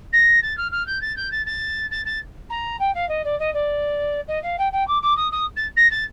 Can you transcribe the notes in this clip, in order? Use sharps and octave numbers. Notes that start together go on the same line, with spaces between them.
A#6
A6
F6
F6
G6
A6
G6
A6
A6
A6
A6
A#5
G5
F5
D#5
D5
D#5
D5
D#5
F5
G5
G5
D6
D6
D#6
D#6
A6
A#6
A6